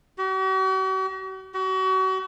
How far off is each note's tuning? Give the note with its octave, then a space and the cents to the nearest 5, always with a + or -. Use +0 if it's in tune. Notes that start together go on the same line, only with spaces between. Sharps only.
F#4 +45
F#4 +35